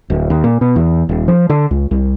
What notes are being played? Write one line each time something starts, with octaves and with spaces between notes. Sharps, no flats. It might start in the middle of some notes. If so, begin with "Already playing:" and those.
D1
D#2
A#2
B2
E2
D#1
F3
D3
C#2
C2